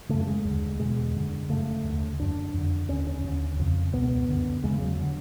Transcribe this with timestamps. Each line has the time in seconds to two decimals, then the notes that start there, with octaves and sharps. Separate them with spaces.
0.09 F#2 C#3 A3
0.27 G#3
0.45 D#2 D3
0.79 E2 B2 G#3
1.15 F#2 D3
1.49 F#2 C#3 A3
1.84 D#2 D3
2.19 F#2 D3 D4
2.54 F2 D3
2.88 D#2 D3 C#4
3.07 C#4
3.24 D#2 D3
3.59 F2 C#3
3.93 C#2 B2 B3
4.28 F#2 D3
4.63 E2 C#3 G#3
4.81 F#3
5.01 D3